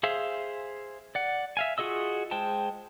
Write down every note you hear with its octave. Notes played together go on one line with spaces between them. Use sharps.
G#4 C5 E5 F5
D5 F#5
E5 F5 G#5
F4 F#4 G#4 D#5 E6
G#3 C5 G5 A5